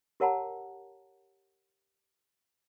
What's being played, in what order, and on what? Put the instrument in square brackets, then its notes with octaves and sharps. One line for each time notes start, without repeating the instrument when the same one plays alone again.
[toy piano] G4 A#4 C#5 F#5 A5 A#5